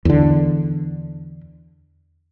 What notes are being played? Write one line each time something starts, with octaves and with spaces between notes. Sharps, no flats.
E2 D3